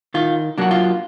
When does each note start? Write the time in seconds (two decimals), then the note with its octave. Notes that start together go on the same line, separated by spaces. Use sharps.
0.14 D#3 F4
0.58 F#3 A#3 D4 F#4
0.71 F4